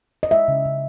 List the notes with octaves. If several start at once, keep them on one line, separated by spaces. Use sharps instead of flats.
D#5
G#3 E5
C#3
C#3